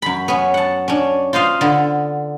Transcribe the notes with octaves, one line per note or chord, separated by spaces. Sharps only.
F#2 B5
B3 C#4
F#5 A5
C#4 D4
F4 C5 D#5 F5
D3 B3